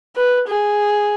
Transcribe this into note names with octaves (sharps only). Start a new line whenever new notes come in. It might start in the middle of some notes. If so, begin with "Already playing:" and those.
B4
G#4